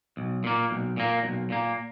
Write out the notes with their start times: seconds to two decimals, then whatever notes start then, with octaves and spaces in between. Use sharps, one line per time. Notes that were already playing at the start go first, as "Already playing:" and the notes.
0.17 B1
0.44 A#2 A#3
0.71 B1
0.97 A#2 A#3
1.23 B1
1.50 A#2 A#3